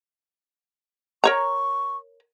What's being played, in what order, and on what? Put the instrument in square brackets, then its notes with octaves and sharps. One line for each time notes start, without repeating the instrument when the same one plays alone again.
[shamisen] A#4 C#5 A#5 [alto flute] C#6